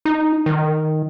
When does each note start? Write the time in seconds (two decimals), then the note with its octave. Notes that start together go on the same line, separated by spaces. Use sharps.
0.05 D#4
0.46 D#3